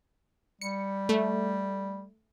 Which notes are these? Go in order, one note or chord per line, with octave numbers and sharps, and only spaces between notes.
G3 C#7
A3